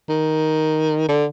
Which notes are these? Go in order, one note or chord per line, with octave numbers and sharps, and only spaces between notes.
D#3
D3